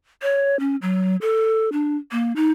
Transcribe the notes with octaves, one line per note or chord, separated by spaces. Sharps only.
C#5
C#4
F#3
A4
D4
A#3
D#4